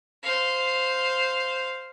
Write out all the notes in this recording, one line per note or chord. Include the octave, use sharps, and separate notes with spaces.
C5 F5